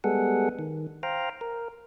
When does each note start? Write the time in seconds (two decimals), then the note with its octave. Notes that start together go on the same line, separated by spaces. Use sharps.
0.04 G3 G#3 B3 G#4 A4 F#5
0.59 D#3
1.03 C5 F5 G5 A#5
1.41 A#4